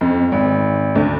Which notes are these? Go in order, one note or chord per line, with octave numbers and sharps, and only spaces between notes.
F2
G#1
D2